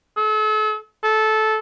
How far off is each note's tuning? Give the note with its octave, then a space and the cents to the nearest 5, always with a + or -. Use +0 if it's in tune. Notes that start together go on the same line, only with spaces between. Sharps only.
A4 -40
A4 -15